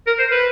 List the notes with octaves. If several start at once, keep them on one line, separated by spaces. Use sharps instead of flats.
A#4
C5
B4